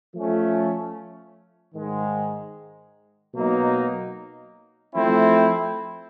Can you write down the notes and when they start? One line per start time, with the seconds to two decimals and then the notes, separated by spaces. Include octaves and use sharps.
0.15 F3 A3 C#4
1.74 G#2 D#3 G#3
3.33 B2 F#3 A#3 D#4
4.93 F3 A3 C4 E4